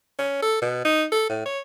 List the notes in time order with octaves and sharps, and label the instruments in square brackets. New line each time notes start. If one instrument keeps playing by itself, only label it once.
[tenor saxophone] C#4
A4
B2
D#4
A4
A2
C#5